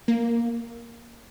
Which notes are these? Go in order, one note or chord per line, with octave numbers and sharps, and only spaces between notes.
A#3